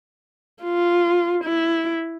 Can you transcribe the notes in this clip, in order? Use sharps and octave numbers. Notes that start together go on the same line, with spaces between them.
F4
E4